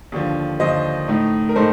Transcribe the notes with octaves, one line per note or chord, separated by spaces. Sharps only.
D#2 D3 F3
D#2 D3 F3 C5 D#5
A2 A3 D#4
A#4
A2 A3 D#4 A4 C5